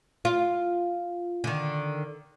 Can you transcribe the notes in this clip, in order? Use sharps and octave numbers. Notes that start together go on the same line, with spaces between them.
F4
D3 D#3